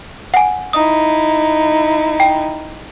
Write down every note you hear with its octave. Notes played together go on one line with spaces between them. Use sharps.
F#5 G#5
D#4 E4 D#6
G5